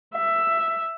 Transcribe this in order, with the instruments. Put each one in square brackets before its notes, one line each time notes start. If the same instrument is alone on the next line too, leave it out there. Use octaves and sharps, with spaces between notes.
[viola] E5